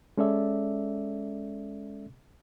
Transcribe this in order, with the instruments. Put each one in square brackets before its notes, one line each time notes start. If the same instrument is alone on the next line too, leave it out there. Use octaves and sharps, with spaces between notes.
[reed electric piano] G#3 C#4 A4 D5 E5